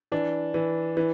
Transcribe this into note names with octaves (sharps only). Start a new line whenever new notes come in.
E3 D4
E3
E3